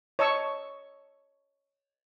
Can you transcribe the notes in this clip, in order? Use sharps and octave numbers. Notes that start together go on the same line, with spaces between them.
C#5 D#5 A5 C#6 E6